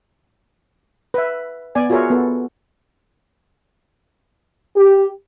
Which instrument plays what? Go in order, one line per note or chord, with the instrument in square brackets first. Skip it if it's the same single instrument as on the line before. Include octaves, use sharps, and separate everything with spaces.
[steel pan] B4 E5
B3 D5 G#5
F4 F#4 G#4 A#4 C#5 E5
B3 A4
[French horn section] G4